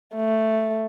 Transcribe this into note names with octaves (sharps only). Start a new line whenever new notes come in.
A3